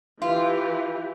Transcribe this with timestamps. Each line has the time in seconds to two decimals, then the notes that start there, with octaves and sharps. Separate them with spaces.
0.22 E3 F4 G4